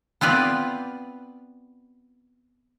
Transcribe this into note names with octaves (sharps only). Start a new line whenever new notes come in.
B3 C4 F4 B4 D5